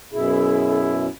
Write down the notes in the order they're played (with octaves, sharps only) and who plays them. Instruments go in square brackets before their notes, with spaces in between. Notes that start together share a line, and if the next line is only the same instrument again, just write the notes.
[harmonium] F#2 B2 E4 [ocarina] G#4